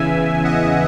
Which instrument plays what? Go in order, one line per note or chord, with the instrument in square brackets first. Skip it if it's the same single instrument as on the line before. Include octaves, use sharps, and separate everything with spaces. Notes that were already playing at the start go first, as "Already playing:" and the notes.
Already playing: [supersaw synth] E2 C#3 E3 E5 G#5
D#5 F#5